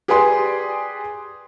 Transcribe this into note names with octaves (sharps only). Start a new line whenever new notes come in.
G4 G#4 B4 D5 G#5 C6